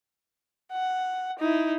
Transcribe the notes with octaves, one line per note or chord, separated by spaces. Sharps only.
F#5
D#4 E4